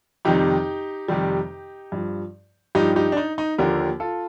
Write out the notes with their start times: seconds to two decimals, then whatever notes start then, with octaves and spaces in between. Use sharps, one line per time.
0.25 F2 C3 D#3 G3 D#4 G4
1.08 F2 C3 D#3 G3
1.92 G2 F3
2.75 G2 F3 D#4 G4
2.96 D#4 G4
3.12 D4
3.17 D#4
3.38 D#4
3.58 D#2 D3 F3 G4 A#4
4.00 F4 A4